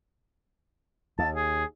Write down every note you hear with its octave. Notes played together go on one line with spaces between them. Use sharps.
D#2 A5
G#4